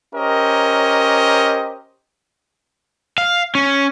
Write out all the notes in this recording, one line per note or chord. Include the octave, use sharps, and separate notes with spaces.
C#4 G4 A#4 C5 D#5
F5
C#4